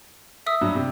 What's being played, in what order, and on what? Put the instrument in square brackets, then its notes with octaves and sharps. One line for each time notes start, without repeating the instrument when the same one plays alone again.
[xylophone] E5 D#6 E6
[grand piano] G2 F#3
C3